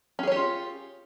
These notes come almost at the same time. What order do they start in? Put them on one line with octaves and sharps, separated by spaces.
C#4 G#4 C#5 G4 F4